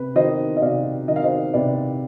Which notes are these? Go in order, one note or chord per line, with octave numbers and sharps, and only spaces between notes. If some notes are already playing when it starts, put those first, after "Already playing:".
Already playing: C3 B4
D#3 C5 D#5
D#5
C3 D5 F5
D#3 D#5
F5
C5 D#5
C3 B4 D5